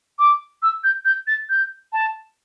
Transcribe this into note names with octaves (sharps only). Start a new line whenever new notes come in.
D6
E6
G6
G6
A6
G6
A5